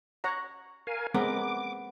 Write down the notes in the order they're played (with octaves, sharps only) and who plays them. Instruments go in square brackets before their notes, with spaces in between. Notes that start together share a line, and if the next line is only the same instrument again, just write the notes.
[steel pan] C#5 F#5 A#5
[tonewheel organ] A#4 F5 G#5
[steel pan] G#3 C4 A#4 [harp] B3 [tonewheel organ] D6